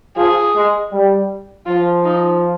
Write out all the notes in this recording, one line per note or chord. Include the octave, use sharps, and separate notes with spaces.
F3 G#4
G#3
G3
F3 F4
D#4